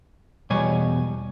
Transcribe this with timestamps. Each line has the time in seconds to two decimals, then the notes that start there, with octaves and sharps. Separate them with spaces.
0.50 E2 B2 G3 C#5 G#5